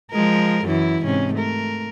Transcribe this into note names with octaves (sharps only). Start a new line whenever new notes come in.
F3 G#3 A#4
F#2 E3 E4
G#2 C3 C#4
A3 A#4